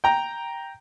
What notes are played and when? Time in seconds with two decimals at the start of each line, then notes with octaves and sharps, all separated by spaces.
0.04 G5 A#5